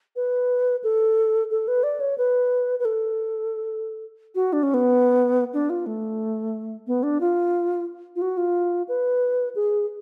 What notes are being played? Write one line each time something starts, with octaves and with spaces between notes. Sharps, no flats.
B4
A4
A4
B4
D5
C#5
B4
B4
A4
F#4
D4
C#4
B3
D4
F4
A3
B3
D4
F4
F4
F#4
F4
B4
G#4